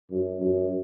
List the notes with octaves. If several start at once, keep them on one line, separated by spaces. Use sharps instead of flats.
F#2
F#2